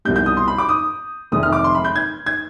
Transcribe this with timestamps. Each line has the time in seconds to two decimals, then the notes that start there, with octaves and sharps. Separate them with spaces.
0.05 C2 B2 G3 G6
0.16 G6
0.26 D#6
0.37 C6
0.48 B5
0.58 D6
0.69 D#6
1.32 F1 F2 C3 D#3 G#3 D#6
1.43 F6
1.53 D6
1.64 C6
1.75 B5
1.85 G6
1.96 G#6
2.26 G#6